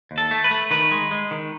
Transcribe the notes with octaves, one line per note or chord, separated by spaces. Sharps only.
D#2
A4
A3
B4
A3
D#3 B4
G#3
G#3
D#3